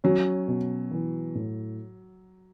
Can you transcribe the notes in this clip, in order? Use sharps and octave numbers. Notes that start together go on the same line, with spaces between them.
F#3 C#4
B2
E3
A2